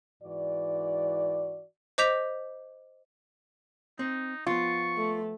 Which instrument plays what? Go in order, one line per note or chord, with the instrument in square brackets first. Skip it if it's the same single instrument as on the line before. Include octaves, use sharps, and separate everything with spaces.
[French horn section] G#2 E3 F#4 D5
[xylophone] C5 D#5 D6 G6 B6 F7
[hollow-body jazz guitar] C4 [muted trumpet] D#4
[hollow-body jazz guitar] F3 B3 [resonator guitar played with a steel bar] F4 [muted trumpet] C#6
[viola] A3